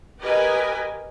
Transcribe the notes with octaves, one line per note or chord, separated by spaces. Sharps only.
G4 A#4 B4 D#5 G#5